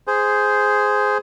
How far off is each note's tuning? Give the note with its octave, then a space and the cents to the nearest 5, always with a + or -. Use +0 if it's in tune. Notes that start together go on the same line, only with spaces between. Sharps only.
G#4 +0 C5 -10